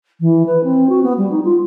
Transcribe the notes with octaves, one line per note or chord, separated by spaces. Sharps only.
E3
B4
C4
F#4
B3
G3
D#4
F4